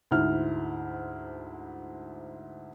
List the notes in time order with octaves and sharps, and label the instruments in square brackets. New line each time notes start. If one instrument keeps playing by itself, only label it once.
[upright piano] D2 G#2 E4 F6